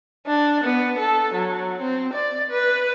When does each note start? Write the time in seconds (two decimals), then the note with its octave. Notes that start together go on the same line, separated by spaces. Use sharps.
0.27 D4
0.64 B3
0.99 A4
1.34 F#3
1.81 C4
2.13 D5
2.50 B4